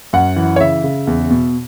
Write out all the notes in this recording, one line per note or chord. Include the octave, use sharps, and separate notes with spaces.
F#2 F#5
E3
C#5
C#3 E5
C#3
E2
B2